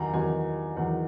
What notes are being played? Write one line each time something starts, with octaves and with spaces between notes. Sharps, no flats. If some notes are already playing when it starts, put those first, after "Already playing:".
Already playing: E2 D#3 F#3 F#5 A#5
E2 D#3 F#3 G#5
E2 D#3 F#3 F#5